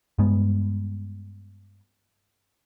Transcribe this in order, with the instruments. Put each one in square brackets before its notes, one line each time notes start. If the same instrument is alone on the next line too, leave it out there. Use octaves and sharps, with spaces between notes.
[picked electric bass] G2 G#3 B3